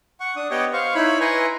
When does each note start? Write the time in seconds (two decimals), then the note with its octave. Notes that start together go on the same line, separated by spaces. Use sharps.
0.20 F#5 C#6
0.36 D4 D#6
0.51 B3 G4 C#5 D#5 F#5 G5
0.73 C5 F5 C#6
0.95 D#4 E4 C#5 B5
1.20 E4 B4 G#5 A#5 C6 C#6